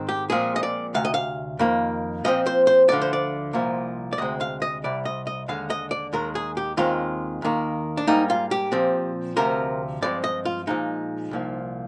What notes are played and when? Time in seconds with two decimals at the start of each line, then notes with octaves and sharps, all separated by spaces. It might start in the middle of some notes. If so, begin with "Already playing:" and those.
Already playing: G#2 D#3 G#3 C4
0.09 G4
0.30 A#2 F3 G#3 C4 G#4
0.56 D#5
0.63 D5
0.94 D2 C3 F5
1.05 D#5
1.14 F5
1.59 F2 D#3 A#3
2.24 A#2 F3 C4 D#5
2.46 C5
2.67 C5
2.89 D2 D3 F3 D5
3.02 C5
3.13 D5
3.53 C2 A#2 F3 A#3
4.13 D5
4.18 D2 C3 G#3 C4 D#5
4.41 F5
4.62 D#5
4.84 C2 C3 G3 D5
5.05 D#5
5.27 D#5
5.48 D#2 D3 G#3 F5
5.70 D#5
5.91 D5
6.13 D#2 D#3 G#3 A#4
6.35 G#4
6.57 G4
6.77 D#2 D#3 G#3 C4 F4
7.42 D#2 D#3 A#3
7.97 D4
8.07 G#2 G3 A#3 D#4
8.30 F4
8.51 G4
8.72 A#2 F3 C4
9.36 D2 C3 F3 C4 A#4
10.02 G2 F3 G#3 C4 D5
10.24 D#5
10.45 F4
10.67 A#2 F3 G#3 D#4
11.31 C2 A#2 F3